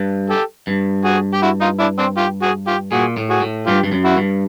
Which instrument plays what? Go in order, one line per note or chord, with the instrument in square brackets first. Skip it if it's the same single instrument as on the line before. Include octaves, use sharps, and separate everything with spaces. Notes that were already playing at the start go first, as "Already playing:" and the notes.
Already playing: [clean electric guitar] G2
[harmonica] G4 A4
[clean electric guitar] G2
[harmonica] F#4 G#4
G4
E4 F#4
D#4 F4
D4 E4
C4 D4
F4 G4
F#4 G#4
F4 G4
[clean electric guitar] A#2 [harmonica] F#4 G#4
[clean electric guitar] A2
[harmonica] F#4 G#4
[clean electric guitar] A2
[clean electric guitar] G2 [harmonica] F4 G4
[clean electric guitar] G2
F#2
[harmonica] E4 F#4
[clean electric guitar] G2